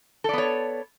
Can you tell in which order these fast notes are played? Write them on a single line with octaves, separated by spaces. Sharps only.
A4 D5 B3 C#5